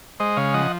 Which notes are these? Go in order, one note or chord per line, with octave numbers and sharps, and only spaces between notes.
G#3 C5 D#5
C#3 C#5 F5
F3 D#5 F#5